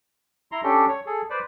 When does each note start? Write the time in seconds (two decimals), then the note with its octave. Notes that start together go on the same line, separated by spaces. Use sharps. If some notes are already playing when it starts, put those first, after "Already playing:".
0.52 E4 A#5 C6
0.63 C#4 D4 G4 A4
0.88 C#5
1.06 G#4 A4
1.30 B4 C5 D5